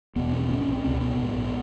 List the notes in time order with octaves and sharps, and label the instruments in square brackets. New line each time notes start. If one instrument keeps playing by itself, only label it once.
[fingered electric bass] F#1 E2 B2 B3
C4
A#1 G#2 C#4
C#4
C4
C#2 B2 C4
B3
A#1 G#2